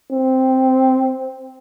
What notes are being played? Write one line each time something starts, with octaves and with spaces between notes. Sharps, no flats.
C4